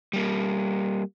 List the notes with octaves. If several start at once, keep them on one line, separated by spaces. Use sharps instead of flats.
G3 A#3